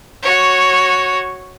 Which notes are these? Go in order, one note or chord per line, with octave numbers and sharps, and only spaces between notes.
F#4 C#5